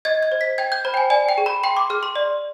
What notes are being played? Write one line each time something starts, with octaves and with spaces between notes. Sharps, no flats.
D#5 G#6
G#6
C5
B6
G5 G#6
G6
C5 B5
G5
G#5
D5 G#5
G5
G#4
B5
G5 C6
D6
G#4 F6
C6
D5